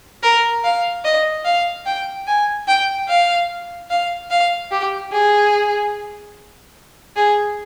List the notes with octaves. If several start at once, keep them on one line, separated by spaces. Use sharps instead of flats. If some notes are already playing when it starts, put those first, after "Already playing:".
A#4
F5
D#5
F5
G5
G#5
G5
F5
F5
F5
G4
G#4
G#4